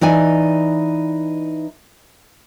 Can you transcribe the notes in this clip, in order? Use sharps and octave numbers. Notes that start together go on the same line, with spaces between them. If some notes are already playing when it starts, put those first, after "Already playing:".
E3 D#4 D5 G#5